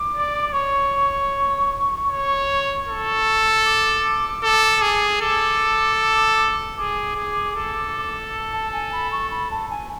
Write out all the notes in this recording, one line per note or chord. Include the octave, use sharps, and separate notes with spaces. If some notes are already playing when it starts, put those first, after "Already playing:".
Already playing: D6
D5
C#5 C#6
C#5
A4
D6
A4
G#4
A4 D6
G#4 D6
G#4
A4
A5
G#5
B5
C#6
B5
A5
G#5